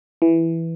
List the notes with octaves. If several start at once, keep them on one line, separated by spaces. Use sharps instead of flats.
E3